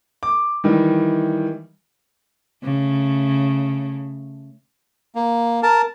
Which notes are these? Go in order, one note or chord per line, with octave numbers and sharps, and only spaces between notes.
D6
D#3 E3 G3
C#3 A3
A#3
A#4 A5